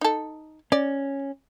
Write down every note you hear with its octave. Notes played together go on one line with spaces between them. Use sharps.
D#4 A4
C#4 D5